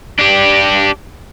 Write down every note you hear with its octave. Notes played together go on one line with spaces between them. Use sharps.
D4 G4